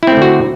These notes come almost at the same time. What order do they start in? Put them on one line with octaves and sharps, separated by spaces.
E4 C4 A3 D3 F#4